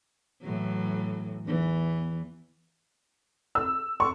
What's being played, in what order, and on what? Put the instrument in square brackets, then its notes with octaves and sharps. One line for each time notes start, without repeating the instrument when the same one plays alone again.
[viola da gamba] A2 E3 F#3
E2 E3
[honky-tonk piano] E6
C#6